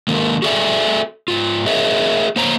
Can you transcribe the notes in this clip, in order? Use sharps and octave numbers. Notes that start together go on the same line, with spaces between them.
D#3 G#3 A#3 A#4
F#4 G#4 A4 D5 E5 G#5
G#2 F4
G#4 A#4 C#5 D#5 E5
A#3 C5 C#5 A#5